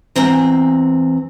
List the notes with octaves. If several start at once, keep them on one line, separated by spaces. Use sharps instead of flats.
E2 E3 C4 A#5